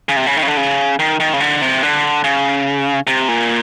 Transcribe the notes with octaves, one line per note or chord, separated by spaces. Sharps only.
C#3
C3
C#3
D#3
C#3
D3
C#3
D#3
D#3
C#3
D3
C3
D3
C#3
C3
A#2